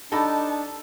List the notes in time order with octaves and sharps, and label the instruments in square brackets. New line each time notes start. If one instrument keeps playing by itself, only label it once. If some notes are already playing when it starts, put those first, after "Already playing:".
[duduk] D4 [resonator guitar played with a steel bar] D#4 G4 D#5 [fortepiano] A4 B5 [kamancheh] A5